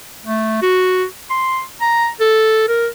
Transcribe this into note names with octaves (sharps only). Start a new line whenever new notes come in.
A3
F#4
C6
A#5
A4
A#4